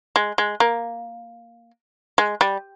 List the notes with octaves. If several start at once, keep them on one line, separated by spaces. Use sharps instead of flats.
G#3
G#3
A#3
G#3
G3